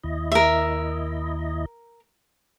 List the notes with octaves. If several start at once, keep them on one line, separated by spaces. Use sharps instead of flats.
D#2 E4 D#5
A#4 E5